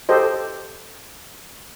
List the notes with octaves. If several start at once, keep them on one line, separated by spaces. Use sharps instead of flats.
G4 A4 C5 D#5